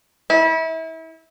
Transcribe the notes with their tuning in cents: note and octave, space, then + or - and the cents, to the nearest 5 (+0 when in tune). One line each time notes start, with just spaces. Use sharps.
E4 -30